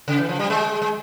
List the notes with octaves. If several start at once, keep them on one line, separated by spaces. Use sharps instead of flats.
C#3
E3
F3
G3
G#3
G#3